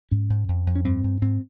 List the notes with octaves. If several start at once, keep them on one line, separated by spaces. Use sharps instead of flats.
G#2 C#4
G#2
F2
F2
C#4
G2 C4
G2
G#2 C4